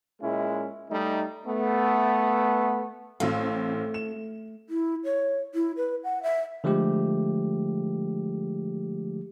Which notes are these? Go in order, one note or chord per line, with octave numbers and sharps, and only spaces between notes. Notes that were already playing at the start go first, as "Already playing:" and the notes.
A#2 G#3 C#4 E4
G3 A3 D#4
A3 B3
A1 A3 C4 F5
E7
E4
C#5
E4
B4
F#5
E5
D3 F3 G#3 A3 G4